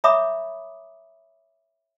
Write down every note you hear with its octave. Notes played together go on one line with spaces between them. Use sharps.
C#5 E5 A#5 B5 D6 D#6